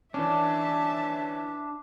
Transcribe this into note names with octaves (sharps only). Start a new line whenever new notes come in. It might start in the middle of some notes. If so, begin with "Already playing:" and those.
E3 C#4 D4 E5 A5